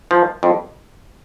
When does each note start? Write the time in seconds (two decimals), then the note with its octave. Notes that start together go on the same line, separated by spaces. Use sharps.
0.11 F3
0.43 F2